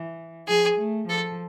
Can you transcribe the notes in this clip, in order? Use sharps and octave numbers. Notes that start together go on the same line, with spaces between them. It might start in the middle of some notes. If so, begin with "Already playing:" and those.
Already playing: E3
F3 G#4
A3
F3 A4